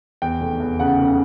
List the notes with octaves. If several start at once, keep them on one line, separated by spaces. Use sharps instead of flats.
E2 G5
F1
E2
C#3 F#5
F1